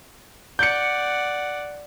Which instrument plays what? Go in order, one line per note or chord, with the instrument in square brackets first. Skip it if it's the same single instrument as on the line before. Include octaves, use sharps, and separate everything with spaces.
[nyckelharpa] D5 F#5 [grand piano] G6 C#7